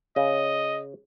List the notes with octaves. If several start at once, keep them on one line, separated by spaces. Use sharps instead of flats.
C#3 D#5